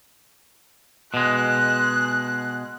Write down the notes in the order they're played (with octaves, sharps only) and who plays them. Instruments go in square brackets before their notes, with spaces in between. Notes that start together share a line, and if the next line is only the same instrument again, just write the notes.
[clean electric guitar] B2 G#3 [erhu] F#6